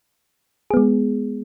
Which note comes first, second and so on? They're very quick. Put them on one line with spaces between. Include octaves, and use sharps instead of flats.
G#4 B3 G#3